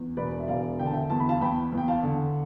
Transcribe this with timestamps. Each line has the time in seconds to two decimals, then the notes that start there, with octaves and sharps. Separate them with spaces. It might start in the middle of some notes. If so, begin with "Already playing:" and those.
Already playing: E2
0.17 E1 B4 D5
0.40 E5
0.48 E1 D5 F5
0.79 D3 G5
0.86 A5
0.93 E5 G5
1.10 E2 A5
1.20 B5
1.29 F5 A5
1.41 E2 G5 B5
1.72 E2
1.77 G5
1.88 F5 A5
2.03 D3